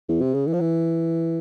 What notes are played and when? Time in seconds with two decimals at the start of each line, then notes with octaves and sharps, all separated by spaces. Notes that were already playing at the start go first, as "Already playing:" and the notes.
0.09 E2
0.21 C3
0.34 C#3
0.47 E3
0.53 F3
0.61 E3